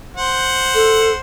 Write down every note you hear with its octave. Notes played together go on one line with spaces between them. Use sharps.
C5 F#5
A4